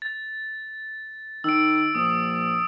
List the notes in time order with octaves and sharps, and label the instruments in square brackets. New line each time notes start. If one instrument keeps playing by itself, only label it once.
[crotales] A6
[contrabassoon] D#3 [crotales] E6 D7
[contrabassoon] A#1 [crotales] D#6